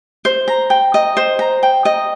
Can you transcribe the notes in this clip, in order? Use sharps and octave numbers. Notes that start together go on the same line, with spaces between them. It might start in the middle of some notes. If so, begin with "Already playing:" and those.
C5
A#5
G5
D#5
C5
A#5
G5
D#5